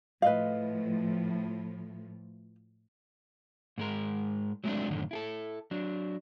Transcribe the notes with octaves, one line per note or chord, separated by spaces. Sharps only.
A2 F3 B4 D#5 F5
G#2 G#3 A#4
F#3 G#3 A3 C4 D4
F#2 A2 D3 D#3
E4 G#4 A4
F#3 D4